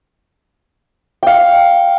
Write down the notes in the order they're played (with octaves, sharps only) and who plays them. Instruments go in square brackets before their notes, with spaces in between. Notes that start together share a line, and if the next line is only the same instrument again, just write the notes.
[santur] F5 G5